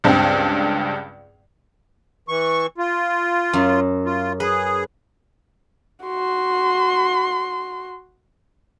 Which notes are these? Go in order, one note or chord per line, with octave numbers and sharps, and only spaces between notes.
C#2 G2 C4
E3 C#6
F4
F#2
F4
G#4 B4
F#4 C6